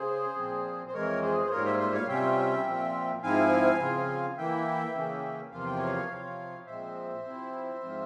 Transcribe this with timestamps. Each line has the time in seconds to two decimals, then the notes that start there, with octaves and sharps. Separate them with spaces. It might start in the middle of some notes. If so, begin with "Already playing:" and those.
Already playing: C#3 G#4 C5
0.37 A#2 F3 C4
0.88 C5
0.93 F2 E3 G#3 A#4 C#5
1.22 G#4 C5
1.46 C5
1.50 G#2 G3 A#3 F4 A#4 C#5
1.65 C5 E5
1.79 C5 E5
1.93 C#5 F5
2.08 C3 G3 C#4 F4 E5 G5
2.65 A#2 F3 C4 F4
3.23 G#2 F3 C4 E4 F5 G#5
3.80 C#3 F3 C4 F4
4.37 E3 A#3 E4 E5 G5
4.95 C#3 E3 A#3 C#4
5.51 E2 C3 F3 A#3 F4 F5
5.65 G5
5.78 C#5 F5
6.09 C3 F3 C4 F4
6.66 A#2 F3 G#3 C4 C5 E5
7.24 C3 F3 C4 E4
7.81 G#2 F3 C4 F4